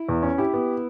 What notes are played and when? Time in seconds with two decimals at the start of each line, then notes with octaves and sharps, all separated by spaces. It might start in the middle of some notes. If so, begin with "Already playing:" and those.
Already playing: E4
0.09 E2
0.23 C#4
0.38 E4 G4
0.54 B3